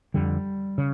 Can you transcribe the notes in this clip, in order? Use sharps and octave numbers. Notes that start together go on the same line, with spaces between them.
F2 D3 G3
C#3